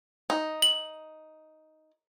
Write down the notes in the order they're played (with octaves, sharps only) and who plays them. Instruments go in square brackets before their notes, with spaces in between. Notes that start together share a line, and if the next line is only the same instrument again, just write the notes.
[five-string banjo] D#4
[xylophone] F#7